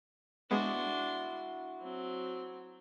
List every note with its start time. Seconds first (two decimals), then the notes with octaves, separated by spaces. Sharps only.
0.51 G#3 B3 D4 E4 F#4 C6
1.80 F#3 C4